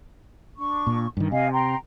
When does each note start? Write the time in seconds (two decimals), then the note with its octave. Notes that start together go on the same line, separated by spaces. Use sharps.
0.57 D4 C#6
0.87 A#2
1.17 G2 D#3
1.32 C3 D#5 F5 G#5
1.53 G5 A#5 C6